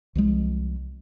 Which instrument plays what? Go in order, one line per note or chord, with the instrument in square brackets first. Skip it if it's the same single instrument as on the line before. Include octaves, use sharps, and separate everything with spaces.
[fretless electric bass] C2 F3 G#3